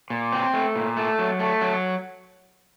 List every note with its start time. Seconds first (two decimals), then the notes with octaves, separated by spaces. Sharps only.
0.10 A#2
0.32 C4
0.54 A3
0.76 A#2
0.97 A3
1.19 F#3
1.39 A3
1.61 F#3